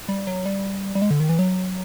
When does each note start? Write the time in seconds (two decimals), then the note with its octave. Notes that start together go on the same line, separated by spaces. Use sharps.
0.09 G3
0.27 F#3
0.46 G3
0.95 G3
1.02 G#3
1.11 D3
1.20 D#3
1.29 E3
1.39 F#3